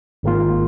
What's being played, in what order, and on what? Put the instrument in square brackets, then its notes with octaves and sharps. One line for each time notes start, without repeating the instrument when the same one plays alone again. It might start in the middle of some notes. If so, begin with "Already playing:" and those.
[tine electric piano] G#1 G#2 D#3 A#3 F4